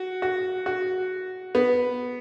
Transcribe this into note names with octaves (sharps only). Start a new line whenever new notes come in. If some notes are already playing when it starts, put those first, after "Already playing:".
Already playing: F#4
F#4
F#4
B3